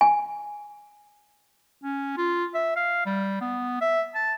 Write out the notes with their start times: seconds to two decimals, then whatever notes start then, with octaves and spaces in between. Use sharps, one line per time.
0.01 G#5
1.84 C#4
2.18 F4
2.55 E5
2.76 F5
3.06 G3
3.41 B3
3.81 E5
4.15 A5